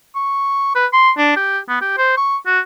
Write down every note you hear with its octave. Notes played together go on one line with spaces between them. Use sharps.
C#6
B4
C6
D4
G4
B3
G4
C5
C#6
F#4